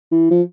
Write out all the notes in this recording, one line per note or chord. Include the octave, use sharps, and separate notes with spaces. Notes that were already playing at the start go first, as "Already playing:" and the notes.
E3
F3